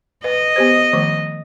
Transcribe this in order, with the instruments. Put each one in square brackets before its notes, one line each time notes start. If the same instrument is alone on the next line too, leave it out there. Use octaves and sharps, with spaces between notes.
[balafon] B4 [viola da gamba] D#5
[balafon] B3 G4 C5
D#3 F3 A3